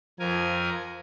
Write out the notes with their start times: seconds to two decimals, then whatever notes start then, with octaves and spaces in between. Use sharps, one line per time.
0.19 F2 F3 A#4 G#5